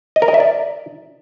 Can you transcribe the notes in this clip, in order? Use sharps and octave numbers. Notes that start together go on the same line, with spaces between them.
D#5
A#4
D#5
E5
D5